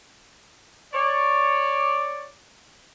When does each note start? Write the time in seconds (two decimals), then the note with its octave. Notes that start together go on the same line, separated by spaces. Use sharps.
0.94 C#5 D5